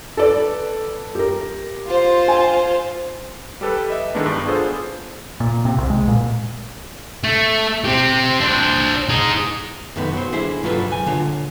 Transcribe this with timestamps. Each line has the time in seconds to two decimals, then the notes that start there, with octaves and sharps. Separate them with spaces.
0.17 A4 B4 D5
1.15 G4 A#4
1.87 F4 C5
2.28 G#5
3.61 G3 G4 A4 B4
3.90 D#5 E5
4.15 D#3 E3 G#3 A3 B3 D4
4.26 G2
4.45 B3 D4 F4 G#4 A4 C5
5.40 A#2
5.65 C3
5.78 C2
5.90 G#3
6.08 A#2
7.24 A3
7.85 C4 G4
8.41 D4 C5
9.09 D#4 G#4
9.96 F#2 D#3 A3 B3
10.13 F#3 C5
10.32 D3 E4 G#4 C5
10.63 G2 F#3 F4 A4 B4
10.88 C#2 G#5
11.06 D3 F4 C#5